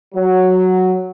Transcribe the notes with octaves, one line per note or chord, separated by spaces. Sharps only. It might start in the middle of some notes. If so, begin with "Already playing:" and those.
F#3